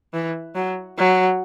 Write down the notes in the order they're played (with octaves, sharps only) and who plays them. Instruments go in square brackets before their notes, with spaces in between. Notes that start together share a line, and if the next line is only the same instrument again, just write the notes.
[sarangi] E3
F#3
F#3